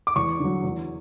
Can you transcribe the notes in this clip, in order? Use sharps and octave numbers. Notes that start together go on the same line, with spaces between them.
D6
E2 C#6
D3 F#3
E2